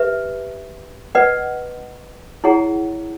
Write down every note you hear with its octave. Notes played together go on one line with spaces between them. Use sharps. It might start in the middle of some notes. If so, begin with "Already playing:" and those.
Already playing: G4 B4 E5
B4 D#5 F#5
E4 G#4 C#5 F#5 A#5